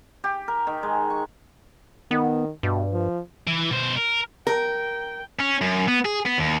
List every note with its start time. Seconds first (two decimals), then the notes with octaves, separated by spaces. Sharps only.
0.24 G4
0.48 A#4
0.67 D#3
0.83 G#3
1.10 C#6
2.11 D#3 B3
2.63 G2 B2
2.92 F3
3.48 E3
3.71 B2 C5
3.96 A#4
4.47 A#4 G5
5.39 C#4
5.61 F#2
5.88 B3
6.05 G#4
6.25 B3
6.38 D#2